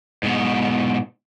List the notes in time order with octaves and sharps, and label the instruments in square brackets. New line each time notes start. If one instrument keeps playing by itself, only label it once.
[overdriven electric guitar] G#2 B2